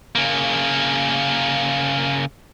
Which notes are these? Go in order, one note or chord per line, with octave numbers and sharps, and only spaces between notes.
C#3 A#3